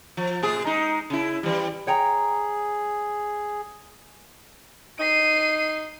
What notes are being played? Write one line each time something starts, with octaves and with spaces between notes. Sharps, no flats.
F3
A2 G#4
G#3 D#4
C#3 E4
E3 G3
G#4 C#5 G5 A#5
D#4 C7 D#7